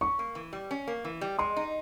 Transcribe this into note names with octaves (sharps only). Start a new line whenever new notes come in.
C#4 C#6
A#3
E3
G3
C#4
A#3
E3
G3
G#3 C6
D#4